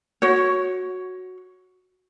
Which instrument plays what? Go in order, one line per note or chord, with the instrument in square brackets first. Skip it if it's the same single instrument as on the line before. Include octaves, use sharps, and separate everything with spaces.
[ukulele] F#4 C#5